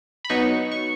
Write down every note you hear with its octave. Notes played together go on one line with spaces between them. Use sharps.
B5
B2 F#3 B3 D#4 C#6
C#6